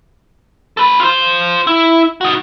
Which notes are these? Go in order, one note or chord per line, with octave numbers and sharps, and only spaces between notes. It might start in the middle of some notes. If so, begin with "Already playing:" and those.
A4 B4
F4 C5
E4
D#4 F#4